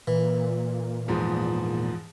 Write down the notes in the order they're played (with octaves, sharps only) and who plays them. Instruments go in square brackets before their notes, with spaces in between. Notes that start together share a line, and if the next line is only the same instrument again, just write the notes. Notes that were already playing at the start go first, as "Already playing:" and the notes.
[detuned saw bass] A#2 [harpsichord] E3
[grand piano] E2 G#2 F3